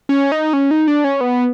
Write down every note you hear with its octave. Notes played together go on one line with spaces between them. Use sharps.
C#4
D#4
C#4
D#4
D4
C#4
B3